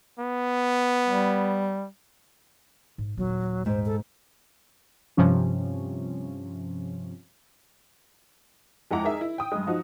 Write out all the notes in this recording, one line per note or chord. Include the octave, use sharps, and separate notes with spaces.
B3
G3
G#2
D#1 F#3 B3
G#2 C5
A4
G2 C3 F3 C#4
F2 G#3 E4 F#5 A#5 D6
D#4 G#4 A#4 D#5 E5
E4
G5 D#6
G2 G#3
F3 D#4 F#4